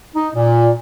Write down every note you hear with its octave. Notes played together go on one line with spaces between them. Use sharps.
D#4
A#2